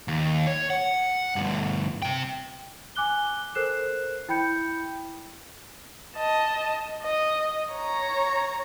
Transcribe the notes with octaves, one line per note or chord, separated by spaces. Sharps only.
D#2
C#5
F#5
D2 G2
C3 G5
G#5 D6 F#6 G7
A4 A#4 C5 F#6 C7 E7
E4 G5 B5 G6 C#7
D#5 A5
D#5
C#5 A#5